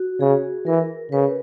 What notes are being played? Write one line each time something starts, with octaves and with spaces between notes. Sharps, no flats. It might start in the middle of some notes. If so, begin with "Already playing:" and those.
Already playing: F#4
C#3 G#4
E3 A#4
C#3 B4